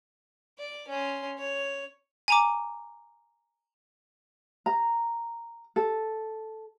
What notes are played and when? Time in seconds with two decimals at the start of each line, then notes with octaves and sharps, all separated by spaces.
0.59 D5
0.88 C#4 C6
1.38 C#5
2.28 G#5 A#5 D6
4.66 A#5
5.76 A4